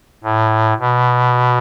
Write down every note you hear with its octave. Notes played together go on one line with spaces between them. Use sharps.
A2
B2